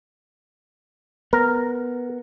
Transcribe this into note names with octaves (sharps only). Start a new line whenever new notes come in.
B3 A#4